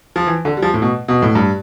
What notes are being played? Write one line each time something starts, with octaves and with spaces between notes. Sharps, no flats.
F3
E3
D3
G3
F3
A2
B2
B2
A2
G2